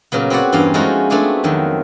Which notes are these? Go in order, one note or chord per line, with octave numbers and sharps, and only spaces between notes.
A#2 C#3 F#3 B3
C4 F#4 B4 C#5 D5 F#5
E2 G2 C4 C#4 F5
F3 G#3 A3 C#4 D#4 F#4
A3 B3 C4 D4 G#4
F2 D#3 F#3